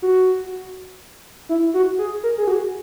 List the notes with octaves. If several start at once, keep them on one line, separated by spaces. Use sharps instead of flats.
F#4
E4
F#4
G#4
A#4
G#4
F#4